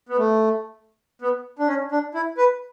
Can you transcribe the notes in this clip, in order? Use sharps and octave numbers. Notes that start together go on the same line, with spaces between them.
B3
A3
B3
D4
C#4
D4
E4
B4